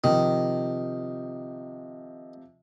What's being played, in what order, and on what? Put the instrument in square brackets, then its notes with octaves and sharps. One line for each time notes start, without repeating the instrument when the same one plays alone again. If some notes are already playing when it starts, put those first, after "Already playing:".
[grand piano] C3 F3 [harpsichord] D#3